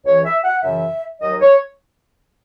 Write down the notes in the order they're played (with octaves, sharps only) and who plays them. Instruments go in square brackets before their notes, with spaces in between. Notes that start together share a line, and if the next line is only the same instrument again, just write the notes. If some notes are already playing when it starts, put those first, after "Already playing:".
[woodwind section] C#2 C#3 E3 C#5
E5
F#5
F#2 C#3 E3 E5
D#2 D#3 F#3 D#5
C#5